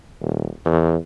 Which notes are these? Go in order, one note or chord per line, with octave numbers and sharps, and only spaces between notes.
D#1
E2